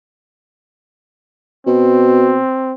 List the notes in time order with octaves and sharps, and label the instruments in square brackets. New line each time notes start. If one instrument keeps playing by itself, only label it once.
[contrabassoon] B2 [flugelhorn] C4